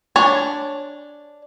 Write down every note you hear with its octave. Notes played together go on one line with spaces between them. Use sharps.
D4 C#5 G#5